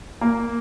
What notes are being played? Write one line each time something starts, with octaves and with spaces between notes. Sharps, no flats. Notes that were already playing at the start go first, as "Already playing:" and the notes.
A#3